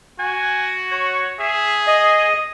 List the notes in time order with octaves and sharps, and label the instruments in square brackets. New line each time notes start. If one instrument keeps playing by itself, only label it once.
[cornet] F#4 [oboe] G#5
[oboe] C#5
[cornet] G#4 [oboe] E5
[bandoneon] D#5 [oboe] D#6